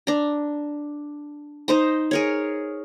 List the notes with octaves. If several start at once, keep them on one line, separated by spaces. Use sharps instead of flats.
D4 A#5
D#4 C5 A#5
G#4 A#4 C#5